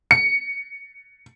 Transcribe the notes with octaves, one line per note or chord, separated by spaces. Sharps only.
C#7